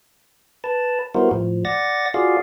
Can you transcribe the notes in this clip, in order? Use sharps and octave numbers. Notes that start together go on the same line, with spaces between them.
B4 A5
G3 B3 E4 F#4 A#4 C5
A2 F3
D5 F#5 A6 A#6
F4 F#4 G#4 D5 F5